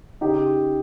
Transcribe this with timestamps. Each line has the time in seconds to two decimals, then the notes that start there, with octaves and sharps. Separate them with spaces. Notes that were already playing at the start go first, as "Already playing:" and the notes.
0.21 C#3 D#4 G4